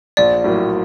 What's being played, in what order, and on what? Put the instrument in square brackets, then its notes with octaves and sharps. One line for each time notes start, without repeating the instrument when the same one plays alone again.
[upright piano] A#1 [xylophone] D5
[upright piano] A2 F#3 A#3